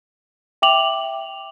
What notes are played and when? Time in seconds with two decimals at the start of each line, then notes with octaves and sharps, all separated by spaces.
0.62 E5 G5 D6 F7 F#7